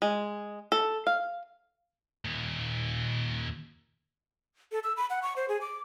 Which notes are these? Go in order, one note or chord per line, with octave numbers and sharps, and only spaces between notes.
G#3
A4
F5
D#2 A#2
A4
E6
B5
F#5
C#6
C5
G#4
D6